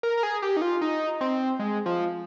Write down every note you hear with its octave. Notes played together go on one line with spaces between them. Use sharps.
A#4
A#4
G#4
G4
D#4
F4
D#4
C4
G#3
F3